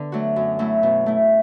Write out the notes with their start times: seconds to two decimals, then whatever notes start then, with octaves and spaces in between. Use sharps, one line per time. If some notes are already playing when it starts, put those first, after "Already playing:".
Already playing: D3 B3 D4
0.12 F#3 A3 F#4
0.36 F#2
0.59 F#3 A3 E4
0.83 B2
1.06 A3 E4